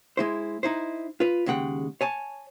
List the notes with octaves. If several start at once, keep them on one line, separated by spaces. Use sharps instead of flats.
G#3 E4 C5
D#4 E4 C5
F4 B4
D#2 C#3 G#3 F#5 G5
C#5 G#5 A5